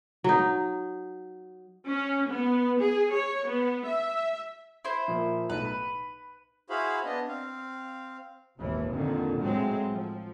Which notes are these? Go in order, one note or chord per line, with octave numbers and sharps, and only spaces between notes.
F#3 D#4
C#4
B3
G#4
C#5
B3
E5
E4 C5
A#2 F3 A#3
B1 A2 B4
B5
E4 F#4 G#4 C5 F5 B5
B3 D4 D#5
C4 F5
G#1 D#2 A#2 E3
F2 A#2 D3 D#3
A2 F#3 G#3 C4
F3